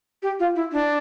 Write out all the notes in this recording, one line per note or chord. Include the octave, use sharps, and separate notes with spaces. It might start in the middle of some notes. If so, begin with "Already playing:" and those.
G4
F4
E4
D4